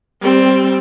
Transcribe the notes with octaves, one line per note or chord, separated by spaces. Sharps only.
G3 C4